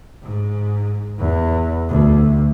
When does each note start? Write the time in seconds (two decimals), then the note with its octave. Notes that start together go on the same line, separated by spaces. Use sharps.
0.23 G#2
1.19 E2
1.89 D2